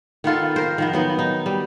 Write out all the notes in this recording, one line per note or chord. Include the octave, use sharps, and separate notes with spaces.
D#3 B3 F4 A4
A#4 C5
D#3 F3 B3
F#3 B3 D#4
D#4
G3